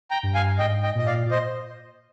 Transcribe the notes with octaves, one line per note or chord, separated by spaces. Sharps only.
G5 A#5
G2
F5 G#5
G#2 D#5 G5
D#5 G5
A#2 D#5
D5 F5
A#2
C5 D#5